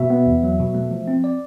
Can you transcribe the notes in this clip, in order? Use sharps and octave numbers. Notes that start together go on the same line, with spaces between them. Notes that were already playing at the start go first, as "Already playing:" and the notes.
Already playing: B2 E5
B3
E2
F#3
B2
A3
F3
C4
D5